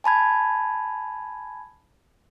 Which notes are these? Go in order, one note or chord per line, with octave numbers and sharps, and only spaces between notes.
G#5 A5 B5 G#6